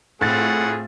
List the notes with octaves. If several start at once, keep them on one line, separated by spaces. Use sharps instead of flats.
A2 A3 C4 F4 G#4 F#5 A6